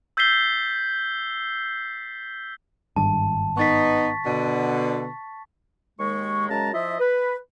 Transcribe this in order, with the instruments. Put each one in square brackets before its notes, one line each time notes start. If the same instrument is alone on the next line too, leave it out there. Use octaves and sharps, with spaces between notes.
[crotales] E6 G6 A6 B6 C7 G7
[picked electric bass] G#1 G2 [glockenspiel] A5
[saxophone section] B3 D#4 [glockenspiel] C#6 A6 B6
[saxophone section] B2 D3
[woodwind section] D#2 G#3 C#6
F#2 C#3 G#3 A5 A#5
F3 E4 F4 D#5 E5
B4